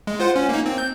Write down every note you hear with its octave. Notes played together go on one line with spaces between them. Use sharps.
G#3
F4 C5 F#5
C#4
A#3 D#4
C4
G6